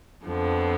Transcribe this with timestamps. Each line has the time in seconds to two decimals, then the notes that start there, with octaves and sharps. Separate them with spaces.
0.25 F2 D3 F3 B3